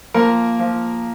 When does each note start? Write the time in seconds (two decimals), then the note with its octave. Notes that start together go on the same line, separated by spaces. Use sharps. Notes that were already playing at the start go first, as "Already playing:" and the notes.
0.14 F3 A#3 A#4
0.59 F3